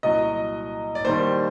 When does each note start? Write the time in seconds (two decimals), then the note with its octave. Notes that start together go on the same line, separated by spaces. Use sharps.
0.03 C2 A#2 F#3 D#5
0.95 D5
1.05 D#2 D#3 G3 C5